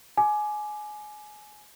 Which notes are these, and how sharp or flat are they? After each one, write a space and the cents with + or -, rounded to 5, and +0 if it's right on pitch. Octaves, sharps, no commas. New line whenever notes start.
G#5 +20 D6 +10